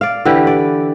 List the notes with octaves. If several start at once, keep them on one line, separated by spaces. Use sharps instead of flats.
D5 F5
D3 E3 G4 B4
D5